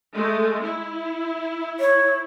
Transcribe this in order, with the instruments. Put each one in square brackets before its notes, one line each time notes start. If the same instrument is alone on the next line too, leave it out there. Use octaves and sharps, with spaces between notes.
[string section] G#3 A3
E4
[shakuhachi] C#5